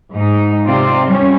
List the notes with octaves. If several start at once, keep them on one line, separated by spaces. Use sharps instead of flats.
G#2 D#4
C3 C4 F4 D5
G3 C#4